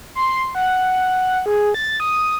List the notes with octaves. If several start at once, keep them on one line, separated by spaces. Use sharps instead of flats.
C6
F#5
G#4
A6
D#6